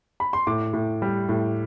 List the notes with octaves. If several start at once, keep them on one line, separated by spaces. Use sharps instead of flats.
B5
C6
A2 D6
A2
G3
A2